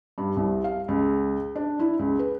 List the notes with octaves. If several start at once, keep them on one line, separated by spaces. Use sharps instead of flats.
G2
C2
F5
C#2
D4
E4
C#2
B4